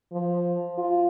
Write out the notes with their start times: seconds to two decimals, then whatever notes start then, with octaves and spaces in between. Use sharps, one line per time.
0.12 F3
0.78 F4